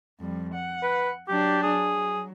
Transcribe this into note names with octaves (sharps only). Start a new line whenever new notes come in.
F2 G3
F#5
B4
F#3 D4 G4
G#4
F#3